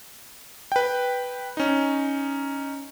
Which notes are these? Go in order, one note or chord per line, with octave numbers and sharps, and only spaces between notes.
B4 G5
C#4 D#4